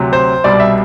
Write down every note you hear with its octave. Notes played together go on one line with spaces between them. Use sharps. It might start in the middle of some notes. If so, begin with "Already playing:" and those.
Already playing: D2 C3 F#3
C5
C2 B2 G3 D5
E5